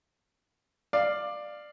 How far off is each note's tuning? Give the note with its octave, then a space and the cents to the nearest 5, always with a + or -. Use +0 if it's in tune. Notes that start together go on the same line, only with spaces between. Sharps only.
D5 +15 F5 +0